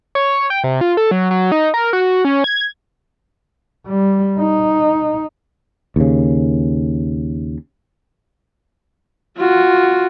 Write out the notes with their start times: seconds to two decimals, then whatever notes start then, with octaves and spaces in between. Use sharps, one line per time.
0.15 C#5
0.50 G5
0.64 C3
0.81 F4
0.97 A4
1.11 F#3
1.31 F#3
1.52 D#4
1.74 A#4
1.93 F#4
2.25 C#4
2.44 G#6
3.86 G3
4.39 D#4
5.96 D#2 C#3
9.38 F4 F#4